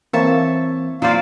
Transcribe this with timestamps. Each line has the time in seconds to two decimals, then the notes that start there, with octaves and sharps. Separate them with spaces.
0.13 E3 A#3 C4 C#5 E5 A5
1.02 A#2 F#3 C5 D5 F5